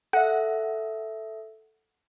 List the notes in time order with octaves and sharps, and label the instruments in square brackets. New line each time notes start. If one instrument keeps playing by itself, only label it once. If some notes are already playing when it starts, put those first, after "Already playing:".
[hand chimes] A4 E5 [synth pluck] F#5